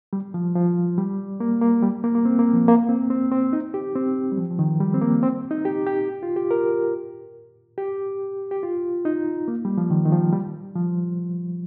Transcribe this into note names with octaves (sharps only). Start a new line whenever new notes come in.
G3
F3
F3
G3
A#3
A#3
G3
A#3
A#3
C4
A#3
F3
A#3
C4
C4
C4
D#4
G4
C4
G3
F3
F3
D#3
G3
C4
A#3
C4
D#4
G4
G4
F4
G4
A#4
G4
G4
F4
D#4
A#3
G3
F3
D#3
D#3
F3
G3
F3